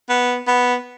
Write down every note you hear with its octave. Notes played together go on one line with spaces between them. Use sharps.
B3
B3